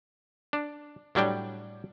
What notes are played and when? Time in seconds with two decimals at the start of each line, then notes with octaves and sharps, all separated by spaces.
0.53 D4
1.15 A2 F#3 G3 D4 G5